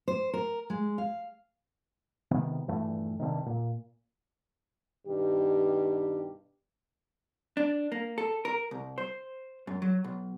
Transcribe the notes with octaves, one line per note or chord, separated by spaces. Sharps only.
C5
A#4
G#3
F5
G#1 C3 D#3 B3
D#1 G2 E3 A3
G2 C3 D#3
A#2
G2 B2 D#3 G4
D4
A#3
A4
A#4
C2
C5
F#2
F#3
B1